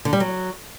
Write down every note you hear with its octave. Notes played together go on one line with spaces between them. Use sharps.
D3
G3
F#3